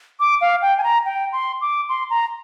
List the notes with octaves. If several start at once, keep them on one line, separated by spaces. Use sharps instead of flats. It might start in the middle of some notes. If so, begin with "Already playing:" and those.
D6
F5
G5
G#5
A#5
G5
C6
D6
C6
A#5